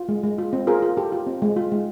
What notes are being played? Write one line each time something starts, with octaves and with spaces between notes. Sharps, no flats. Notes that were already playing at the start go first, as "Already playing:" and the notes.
Already playing: F4
G#3
G#3
F4
C4
F4 G#4 A#4
F4
F4 G4 A4
F4
C4
G#3
F4
G#3